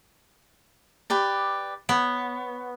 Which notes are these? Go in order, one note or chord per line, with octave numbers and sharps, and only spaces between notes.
G4 B4 D5
B3 C#5